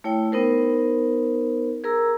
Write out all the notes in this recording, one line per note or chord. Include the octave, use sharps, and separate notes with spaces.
A3 E4 C#5 G5
B3 D#4 A#4 C5
G#4 A#4 A#5 E6